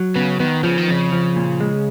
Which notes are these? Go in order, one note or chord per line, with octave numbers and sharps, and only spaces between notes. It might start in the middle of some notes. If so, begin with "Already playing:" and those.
Already playing: F#3
C#3 B3
D#3 B3
C#3 F3
D#3
F2 C#3
F3
A#2
G#3